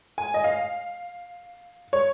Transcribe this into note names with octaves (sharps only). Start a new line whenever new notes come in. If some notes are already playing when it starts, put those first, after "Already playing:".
G#5
D#5
F5
C#5